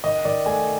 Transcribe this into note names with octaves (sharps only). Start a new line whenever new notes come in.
D#3 D#5
D#3 D5
A3 G#5